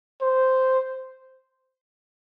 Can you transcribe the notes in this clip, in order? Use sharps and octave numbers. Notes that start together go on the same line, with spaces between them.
C5